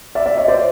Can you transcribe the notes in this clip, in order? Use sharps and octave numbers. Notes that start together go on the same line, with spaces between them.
D5 E5
D5 E5
C#5 D#5
C5 D5